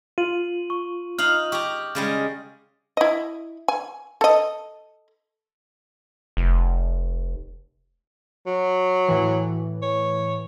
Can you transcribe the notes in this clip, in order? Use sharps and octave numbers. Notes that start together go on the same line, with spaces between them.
F4 D#7 F#7
C#6
D#4 F5 F6 F#7
G4 A#5 C#6 D6
C#3 G3 G#3
E4 D#5
G#5
A4 D#5
F1
F#3
A2 E3
C#5